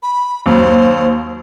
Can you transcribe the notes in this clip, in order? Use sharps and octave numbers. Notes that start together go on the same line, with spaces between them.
B5
D#2 F#3 C5